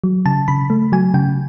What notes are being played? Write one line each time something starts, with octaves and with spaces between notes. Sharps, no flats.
F#3
C#3 A5
C#3 B5
A3
F#3 G#5
C#3 G5